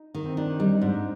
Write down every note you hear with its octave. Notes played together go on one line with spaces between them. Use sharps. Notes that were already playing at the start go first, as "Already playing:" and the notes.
Already playing: D#4
D#3
C4
D#3 D4
G3 D#4
D#4
G#2 D4